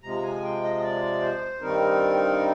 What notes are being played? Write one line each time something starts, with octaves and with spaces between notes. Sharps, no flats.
C3 F3 G#3 A#5
G#5
G5
D#5
D#5
D5
C5
G2 D#3 G3 C4 D#4 A#4